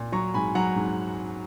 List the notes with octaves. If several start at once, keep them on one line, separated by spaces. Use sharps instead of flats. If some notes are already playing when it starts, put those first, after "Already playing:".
Already playing: A#2
F#3 A#5 C#6
G#2 G#5 B5
F#3 F#5 A#5
G#2